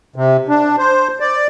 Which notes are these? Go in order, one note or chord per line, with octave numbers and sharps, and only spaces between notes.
C3
D4
C5
D5